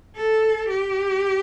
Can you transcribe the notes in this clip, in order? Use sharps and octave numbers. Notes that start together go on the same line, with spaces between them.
A4
G4